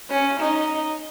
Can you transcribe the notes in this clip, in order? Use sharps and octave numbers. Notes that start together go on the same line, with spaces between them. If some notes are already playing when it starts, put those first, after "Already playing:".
C#4
D#4